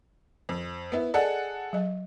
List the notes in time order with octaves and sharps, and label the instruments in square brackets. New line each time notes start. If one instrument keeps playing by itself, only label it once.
[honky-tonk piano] F2
B3 E4
[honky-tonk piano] G#4 A4 F#5 [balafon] D5 D#5 A5
[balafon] F#3 D#5